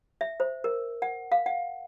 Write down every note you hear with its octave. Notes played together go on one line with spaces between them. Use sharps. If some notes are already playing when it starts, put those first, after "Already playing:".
E5
C5
A#4
F#5
F5
F#5